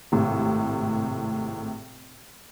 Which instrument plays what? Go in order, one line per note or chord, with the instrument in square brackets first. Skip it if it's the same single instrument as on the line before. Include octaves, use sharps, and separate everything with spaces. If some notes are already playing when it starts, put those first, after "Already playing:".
[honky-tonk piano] G#1 A2 C3